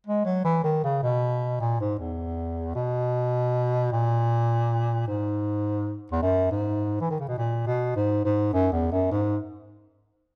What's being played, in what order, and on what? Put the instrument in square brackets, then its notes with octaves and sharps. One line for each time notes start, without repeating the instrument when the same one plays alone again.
[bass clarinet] G#3
F#3
E3
D#3
C#3
B2
A#2
G#2
E2
B2
A#2
G#2
E2
F#2
G#2
E3
D#3
C#3
B2
A#2
B2
G#2
G#2
F#2
E2
F#2
G#2